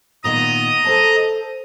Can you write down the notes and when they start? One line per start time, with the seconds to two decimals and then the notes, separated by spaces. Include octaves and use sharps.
0.24 A#2 D#3 B3 D#5 A#5 D#6
0.84 A4 C5 A5